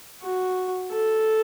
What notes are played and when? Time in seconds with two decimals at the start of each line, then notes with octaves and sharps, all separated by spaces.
0.22 F#4
0.91 A4